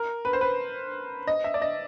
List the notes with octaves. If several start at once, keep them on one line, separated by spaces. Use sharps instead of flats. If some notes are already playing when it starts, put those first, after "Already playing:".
Already playing: A#4
B4
C5
B4
D#5
E5
D5
D#5